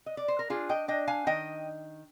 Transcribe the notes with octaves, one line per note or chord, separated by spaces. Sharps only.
D#5
D5
C5
A#4
D4 F4 G#4
D#5 G5
D4 D#5 G5
F5 G#5
D#3 D#5 G5